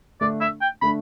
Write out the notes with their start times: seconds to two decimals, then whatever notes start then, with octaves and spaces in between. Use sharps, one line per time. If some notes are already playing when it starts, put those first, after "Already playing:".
0.21 D3 A3 D4 D5
0.41 E5
0.62 G5
0.81 D3 A3 D4 B5